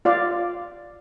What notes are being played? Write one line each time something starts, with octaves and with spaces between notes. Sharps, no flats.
F4 D5 F5